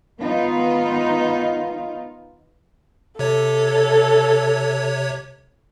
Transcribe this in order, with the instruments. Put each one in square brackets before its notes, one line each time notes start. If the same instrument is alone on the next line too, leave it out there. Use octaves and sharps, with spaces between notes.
[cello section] D#3 B3 D#4 F4
[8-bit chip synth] C3 C#5 [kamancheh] A4